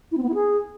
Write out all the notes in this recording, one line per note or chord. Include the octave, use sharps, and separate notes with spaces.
E4
C4
B3
E4
G#4